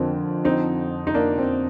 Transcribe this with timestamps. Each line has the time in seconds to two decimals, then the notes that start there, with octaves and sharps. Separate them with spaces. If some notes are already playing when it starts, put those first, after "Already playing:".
Already playing: F2 D3 C4 A#4
0.45 C4 D#4
1.07 D#4
1.14 A#3 D4
1.38 C4